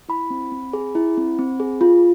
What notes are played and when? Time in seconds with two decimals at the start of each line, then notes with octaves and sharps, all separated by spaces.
0.09 E4 B5
0.30 C4
0.52 C4
0.73 G#4
0.95 E4
1.17 C4
1.39 C4
1.60 G#4
1.81 F4